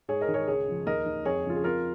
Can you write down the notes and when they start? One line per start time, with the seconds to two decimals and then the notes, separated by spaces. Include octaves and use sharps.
0.08 G#2 G#4 C#5
0.21 A#4 D#5
0.29 D#3
0.34 G#4 C#5
0.48 C#2 G#4 C#5
0.67 C#3 F3
0.86 D#2 A#4 D#5
1.06 D#3
1.25 F2 G#4 C#5
1.45 C#3 F3 F4
1.56 G#4
1.64 F2 F4 A#4